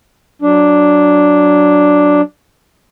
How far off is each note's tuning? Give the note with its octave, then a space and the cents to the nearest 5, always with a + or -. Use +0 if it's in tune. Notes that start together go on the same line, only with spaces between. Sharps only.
F#3 +0 D4 +0